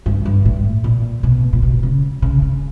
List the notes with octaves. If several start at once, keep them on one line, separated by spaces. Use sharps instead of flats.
G2
G2
A2
A#2
B2
A#2
B2
C#3
C#3
C#3